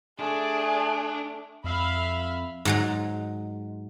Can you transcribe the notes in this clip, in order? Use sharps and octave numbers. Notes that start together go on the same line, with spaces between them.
A3 D4 G#4
F2 E5 F5 B5
G#2 F#3 G#3